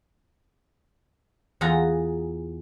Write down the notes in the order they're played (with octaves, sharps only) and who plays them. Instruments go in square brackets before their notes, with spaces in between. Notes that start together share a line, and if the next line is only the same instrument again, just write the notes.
[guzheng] E2 F4 G#4 F#5 A#5